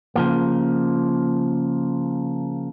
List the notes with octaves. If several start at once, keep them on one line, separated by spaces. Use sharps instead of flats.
C#3 F3 A#3